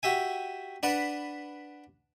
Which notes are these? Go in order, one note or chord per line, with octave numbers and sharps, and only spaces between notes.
F#4 G4 E5 G#5
D4 B4 D5 F#5 B5